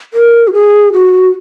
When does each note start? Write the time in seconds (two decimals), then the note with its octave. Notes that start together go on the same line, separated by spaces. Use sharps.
0.14 A#4
0.48 F#4
0.54 G#4
0.93 F#4